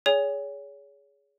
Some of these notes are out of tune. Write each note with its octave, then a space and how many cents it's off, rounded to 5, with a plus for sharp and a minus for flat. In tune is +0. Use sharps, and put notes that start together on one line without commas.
G#4 +0 C#5 +30 G#5 -25